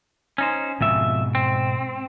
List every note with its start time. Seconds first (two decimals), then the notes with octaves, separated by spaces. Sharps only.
0.38 C#4 D#4 C5
0.81 F2 G#2 B2 E5
1.35 C4